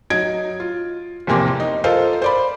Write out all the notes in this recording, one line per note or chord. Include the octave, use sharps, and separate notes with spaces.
F#3 D#4 G#6 D7
F4
F1 E2 C3 A#3 G4 C6
D#4
F4 A4 A#4 C5 D#5 F5
C5 D5 B5